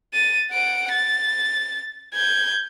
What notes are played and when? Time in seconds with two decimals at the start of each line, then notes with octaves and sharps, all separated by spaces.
0.14 A6 D#7
0.51 F#5 D7
0.92 A6
2.15 G6 G#6